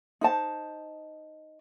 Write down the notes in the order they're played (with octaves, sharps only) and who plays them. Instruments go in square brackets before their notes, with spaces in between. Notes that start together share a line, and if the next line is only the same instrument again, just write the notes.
[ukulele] D#4 C5 A5